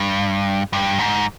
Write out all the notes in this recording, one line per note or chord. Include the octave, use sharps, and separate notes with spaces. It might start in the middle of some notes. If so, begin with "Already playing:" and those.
Already playing: G2
G2
G#2